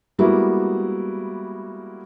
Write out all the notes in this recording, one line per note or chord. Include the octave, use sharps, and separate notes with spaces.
G3 G#3 A#3 B3 E4 F#4